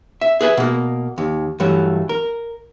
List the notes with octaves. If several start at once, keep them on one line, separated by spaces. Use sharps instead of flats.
E5
G#4 B4 E5 G#5
B2 A#3
D#2
G2 E3 F#3 A3
A#4